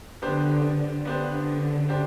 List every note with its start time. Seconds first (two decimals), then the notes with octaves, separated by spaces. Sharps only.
0.22 D3 B3 D4 G4 C5
1.05 D3 B3 D4 G4 C5
1.89 D4 G4 C5